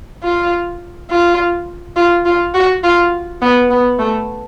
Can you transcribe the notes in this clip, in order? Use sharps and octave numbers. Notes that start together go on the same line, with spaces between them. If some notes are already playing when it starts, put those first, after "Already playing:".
F4
F4
F4
F4
F#4
F4
B3
B3
A3